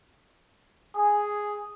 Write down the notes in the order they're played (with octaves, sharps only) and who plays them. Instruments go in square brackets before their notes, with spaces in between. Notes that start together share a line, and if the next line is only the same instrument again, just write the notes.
[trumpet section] G#4